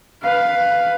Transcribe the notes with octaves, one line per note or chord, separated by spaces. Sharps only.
B4 F5